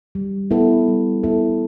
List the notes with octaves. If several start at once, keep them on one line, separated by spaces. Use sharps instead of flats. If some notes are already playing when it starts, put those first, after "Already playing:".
G3
B3 E4 A4
G3
B3 E4 A4